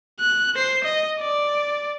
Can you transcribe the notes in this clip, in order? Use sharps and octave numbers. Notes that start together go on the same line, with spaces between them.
F#6
C5 C7
D#5
D5